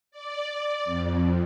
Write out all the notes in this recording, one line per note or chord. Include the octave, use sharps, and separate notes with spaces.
D5
F2